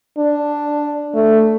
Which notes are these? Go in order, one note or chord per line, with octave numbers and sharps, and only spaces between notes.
D4
A3